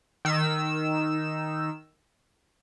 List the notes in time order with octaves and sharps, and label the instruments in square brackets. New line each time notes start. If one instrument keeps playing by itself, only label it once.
[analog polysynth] D#3 E6